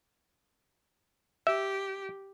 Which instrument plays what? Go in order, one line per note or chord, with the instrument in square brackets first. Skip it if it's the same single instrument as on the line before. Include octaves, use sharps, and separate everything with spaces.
[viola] G4 [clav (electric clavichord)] E5